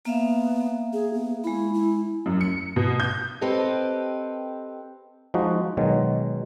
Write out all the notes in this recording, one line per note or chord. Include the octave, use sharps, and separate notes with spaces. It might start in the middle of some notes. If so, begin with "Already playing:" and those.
A#3 B3 E5 F5
G#4
B3
G#3 E4 B5
E4
F#2
C#7
B2
G6
C4 G4 A4 B4 D#5
F3 G#3 D#4 F#4
B2 D#3 F#3 G#3